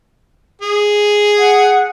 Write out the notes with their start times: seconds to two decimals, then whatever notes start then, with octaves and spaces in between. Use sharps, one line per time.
0.61 G#4
1.38 F#5